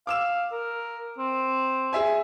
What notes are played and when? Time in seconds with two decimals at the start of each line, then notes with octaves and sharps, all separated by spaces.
0.07 F5 D6 E6 E7
0.52 A#4
1.18 C4
1.93 G#4 E5 G#5